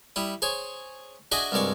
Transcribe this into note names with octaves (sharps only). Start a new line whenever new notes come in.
G3 E4 D#6
G#4 C5 C#5
D4 F#4 G#4 D#5 E5 G#5
C2 G2 G#3 D5 C#6